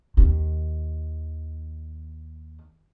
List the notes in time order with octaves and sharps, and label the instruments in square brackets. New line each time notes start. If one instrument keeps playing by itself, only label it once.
[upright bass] D#2 D#3